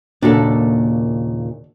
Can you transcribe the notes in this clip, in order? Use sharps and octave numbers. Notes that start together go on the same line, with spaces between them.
D#2 A#2 C#3 D4 F#4 A4